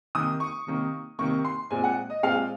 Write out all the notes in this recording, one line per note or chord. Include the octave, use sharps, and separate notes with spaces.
C3 D#3 A#3 D#6
C#6
C3 D#3 A#3
C3 D#3 A#3 C#6
C6
A#2 G#3 C4 G#5
F#5
D#5
A#2 G#3 C4 F5